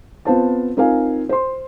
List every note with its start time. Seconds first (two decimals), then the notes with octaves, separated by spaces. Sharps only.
0.25 B3 C4 F4 C5 F5 A5
0.77 C4 D#4 F4 A#4 F5 G#5
1.29 C5 C6